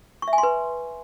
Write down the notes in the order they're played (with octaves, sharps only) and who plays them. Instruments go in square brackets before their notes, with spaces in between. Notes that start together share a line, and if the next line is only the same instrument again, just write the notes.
[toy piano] C#6
E5
G#5
C6
B4